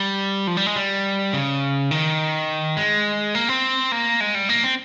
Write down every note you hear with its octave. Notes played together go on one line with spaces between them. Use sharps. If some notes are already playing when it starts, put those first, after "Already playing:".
Already playing: G3
F3
G3
G#3
G3
C#3
D#3
G#3
A#3
C4
A#3
G#3
G3
A#3
C4